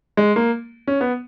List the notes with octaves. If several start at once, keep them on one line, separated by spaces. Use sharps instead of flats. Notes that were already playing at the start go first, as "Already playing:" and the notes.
G#3
A#3
C#4
B3